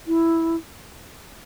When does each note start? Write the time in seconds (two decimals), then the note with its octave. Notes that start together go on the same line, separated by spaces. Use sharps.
0.08 E4